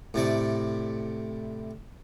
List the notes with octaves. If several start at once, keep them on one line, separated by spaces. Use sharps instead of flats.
A2 C3 D5